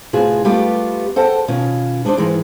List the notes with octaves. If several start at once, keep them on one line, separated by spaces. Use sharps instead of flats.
A2 C3 B3 F4 F#4 G#4
G3 A3 B3 F4 G4 B4
A4 C5 F#5 G5 A5
B2 D#3 C#4 F4
B3 D4 D#4 C5 D5
G#2 D#3 E3 G#3